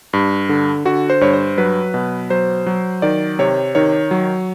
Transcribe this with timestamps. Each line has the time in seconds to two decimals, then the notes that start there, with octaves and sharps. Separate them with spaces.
0.13 G2
0.49 D3
0.85 D3 F#4
1.10 C5
1.21 G2 C#5
1.33 C5
1.58 F#3 B4
1.94 B2
2.30 F#3 C5
2.66 F#3
3.02 D#3 D5
3.39 C3 C#5
3.75 D#3 C#5
4.11 F#3